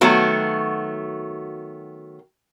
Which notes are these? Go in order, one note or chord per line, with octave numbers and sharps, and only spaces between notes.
D#3 F#3 A3 B3 F#4